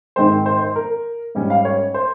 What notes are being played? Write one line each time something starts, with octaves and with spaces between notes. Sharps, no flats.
G#2 D#3 G#3 C4 C5
C5
C5
A#4
G#2 G3 C#4
F5
C#5
C5